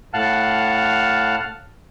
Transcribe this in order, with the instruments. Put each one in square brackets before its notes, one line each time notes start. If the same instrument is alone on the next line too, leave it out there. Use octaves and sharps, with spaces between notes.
[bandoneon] A2 F5 F#5 A5 F6 F#6